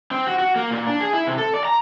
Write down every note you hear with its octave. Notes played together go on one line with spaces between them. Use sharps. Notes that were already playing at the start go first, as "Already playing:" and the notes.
C4
F#4
F#4
A#3
A#2
D4
G#4
E4
C3
A4
D5
A#5